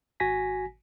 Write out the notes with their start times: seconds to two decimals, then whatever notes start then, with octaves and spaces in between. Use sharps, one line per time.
0.20 G#1 F#4 G#5 A#6 B6